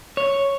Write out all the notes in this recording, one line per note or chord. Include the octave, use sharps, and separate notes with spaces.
C#5